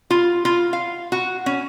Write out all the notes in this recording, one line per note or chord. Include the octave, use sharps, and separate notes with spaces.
F4
F4
F5
F#4
C#4